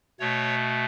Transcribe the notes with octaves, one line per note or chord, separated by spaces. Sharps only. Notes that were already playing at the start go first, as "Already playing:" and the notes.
B2 A3 C#5